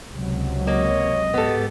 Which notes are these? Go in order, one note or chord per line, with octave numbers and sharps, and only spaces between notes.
C#2 C3 F#3
A#3 C#5 D#5
G#2 G#3 B3 G4 A4